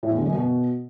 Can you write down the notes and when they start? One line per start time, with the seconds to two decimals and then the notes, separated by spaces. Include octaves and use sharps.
0.03 A2
0.11 E2
0.18 D3
0.26 F#2
0.34 B2